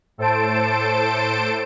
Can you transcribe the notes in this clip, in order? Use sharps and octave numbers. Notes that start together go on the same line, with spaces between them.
A2 A4 C5 A5 D7